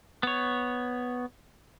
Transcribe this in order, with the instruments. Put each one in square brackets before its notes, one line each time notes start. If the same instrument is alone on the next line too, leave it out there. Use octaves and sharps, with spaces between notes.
[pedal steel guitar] B3 C#5